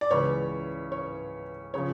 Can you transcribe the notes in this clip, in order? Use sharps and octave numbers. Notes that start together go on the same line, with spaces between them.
D5
C#2 C#3 E3 C#5
C#5
C#3 F3 C#5